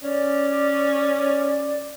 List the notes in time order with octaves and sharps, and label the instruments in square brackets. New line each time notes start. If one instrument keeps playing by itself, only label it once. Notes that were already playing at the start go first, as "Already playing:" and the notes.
[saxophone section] C#4 [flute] D5